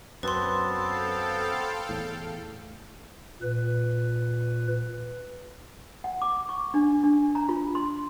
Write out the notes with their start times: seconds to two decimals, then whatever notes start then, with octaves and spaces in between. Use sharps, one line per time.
0.23 F#2 B3 C4 B4 A5 C6
0.58 A4 F5 G5
1.89 E2 A2
3.42 A#2 B4
6.04 F#5
6.22 D6
6.49 C#6
6.74 D4
7.04 D4
7.35 A#5
7.49 F4
7.75 C6